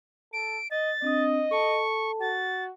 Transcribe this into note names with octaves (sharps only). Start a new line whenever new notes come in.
A4 D7
D#5 A6
C4 D4 D#5 D#6
A4 A5 C#6
F#4 A6